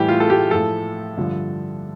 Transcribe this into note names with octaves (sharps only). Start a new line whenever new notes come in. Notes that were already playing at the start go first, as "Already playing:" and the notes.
Already playing: A2 E3 G3 G4
F4
A4
G4
A2 F3 A4
G2 D3 F3